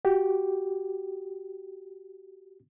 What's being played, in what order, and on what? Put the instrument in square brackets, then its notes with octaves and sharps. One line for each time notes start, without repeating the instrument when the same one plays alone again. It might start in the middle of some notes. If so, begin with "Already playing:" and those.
[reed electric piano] F#4 G4